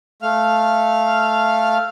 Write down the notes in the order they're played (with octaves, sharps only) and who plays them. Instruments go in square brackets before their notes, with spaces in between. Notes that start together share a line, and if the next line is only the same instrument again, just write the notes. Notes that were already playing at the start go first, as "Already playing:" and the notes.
[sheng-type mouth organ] A3 F5 F6